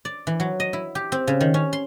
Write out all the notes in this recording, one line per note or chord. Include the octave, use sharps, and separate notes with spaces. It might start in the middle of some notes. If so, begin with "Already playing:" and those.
D5
E3
F#3
D#5
E4
G4
C4
C#3
D#3
C#4
C6